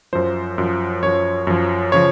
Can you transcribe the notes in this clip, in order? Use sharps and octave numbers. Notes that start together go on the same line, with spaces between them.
F#2 F3 C5
F#2 F3
F#2 F3 C#5
F#2 F3
C#3 F3 C#5